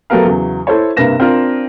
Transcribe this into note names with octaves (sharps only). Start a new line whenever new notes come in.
F#3 A3 B3 G4 A#4 F5
E2 C#3 F#3
E4 A4 C5 C#5
G2 C3 A#3 B4 A#6 E7
C4 D4 F4 A#4